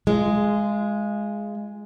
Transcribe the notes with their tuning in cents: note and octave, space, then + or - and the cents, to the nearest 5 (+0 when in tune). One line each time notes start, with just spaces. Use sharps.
G#3 +0 F4 -25